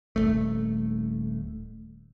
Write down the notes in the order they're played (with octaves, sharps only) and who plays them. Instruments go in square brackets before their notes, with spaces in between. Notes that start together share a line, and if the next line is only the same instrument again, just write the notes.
[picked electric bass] D#1 E2 A3